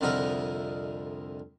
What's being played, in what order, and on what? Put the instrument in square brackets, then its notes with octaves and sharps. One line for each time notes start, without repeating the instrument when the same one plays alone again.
[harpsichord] C2 F2 D3 D#4 E4 A#4